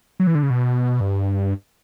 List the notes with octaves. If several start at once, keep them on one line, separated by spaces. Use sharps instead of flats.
F#3
E3
D3
C#3
B2
G2